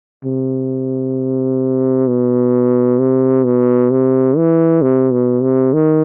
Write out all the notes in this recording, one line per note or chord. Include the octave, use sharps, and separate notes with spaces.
C3
B2
C3
B2
C3
E3
C3
B2
C3
D#3